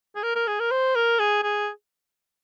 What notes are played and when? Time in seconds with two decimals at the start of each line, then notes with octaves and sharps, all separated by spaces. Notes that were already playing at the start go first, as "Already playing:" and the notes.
0.16 G#4
0.23 A#4
0.35 A#4
0.47 G#4
0.60 A#4
0.71 C5
0.95 A#4
1.19 G#4
1.43 G#4